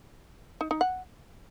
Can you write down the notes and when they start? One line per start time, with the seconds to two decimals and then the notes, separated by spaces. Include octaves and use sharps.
0.61 D#4
0.71 D#4
0.81 F#5